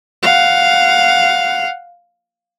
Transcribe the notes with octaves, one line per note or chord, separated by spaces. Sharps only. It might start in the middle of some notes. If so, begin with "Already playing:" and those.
F5 F#5